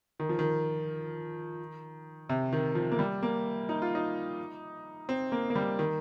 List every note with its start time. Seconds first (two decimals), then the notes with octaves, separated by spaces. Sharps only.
0.20 D#3
0.29 F3
0.39 D#3
2.29 C3
2.53 D#3
2.75 F3
2.92 A#3
2.99 G3
3.23 A#3
3.69 D#4
3.82 F4
3.95 D#4
5.09 C4
5.32 A#3
5.50 A#3
5.56 G3
5.79 D#3